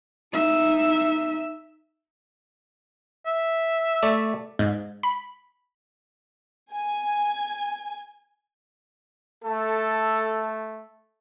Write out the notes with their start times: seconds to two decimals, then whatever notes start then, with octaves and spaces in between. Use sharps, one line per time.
0.32 D#4 E5
3.26 E5
4.03 A3 D5
4.59 G#2
5.03 B5
6.72 G#5
9.44 A3 A4